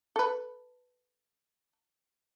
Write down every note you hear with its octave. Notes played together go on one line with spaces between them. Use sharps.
A4 B4